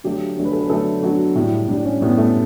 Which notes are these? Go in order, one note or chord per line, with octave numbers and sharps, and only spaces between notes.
D3 F#3 A3 G4
D3 F#3 A3
B4
A4
B4
D3 F#3 A3 A4
D3 F#3 A3 F#4
A2 G3 E4
A2 G3 D4
C#4
A2 G3 B3
A3